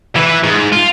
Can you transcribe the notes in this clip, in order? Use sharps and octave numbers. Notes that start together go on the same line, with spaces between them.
E3 B4
G#2
F4